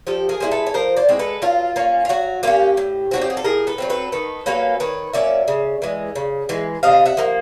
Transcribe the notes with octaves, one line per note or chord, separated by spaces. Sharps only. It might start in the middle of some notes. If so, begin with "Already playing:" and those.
F3 G4 A4
G#4 A#4
G#3 C4 E4
A4 B4
C#5
F3 A#4 C5
C5 D5
G#3 C4 E4
A4 B4
F#3 F4
A#3 C#4
F4
F#3 F#4
A#3 C#4 F4 G4
A2
F#3 A3 C4 F#4
G4
G#4
A4
A2 G#4 A#4
A4 B4
F#3 A3 C4
A4 B4
D#3 A4 B4
F#3 A#3 C#4 A4 B4
D#3 B4 C#5
F#3 A#3 C#4 D5 E5
C#3
E3 G#3
C#3
E3 G#3
C3 D#5 F5
E5 F#5
F3 A#3